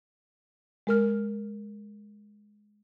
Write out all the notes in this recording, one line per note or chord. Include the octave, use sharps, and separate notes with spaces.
G#3 A#4 F6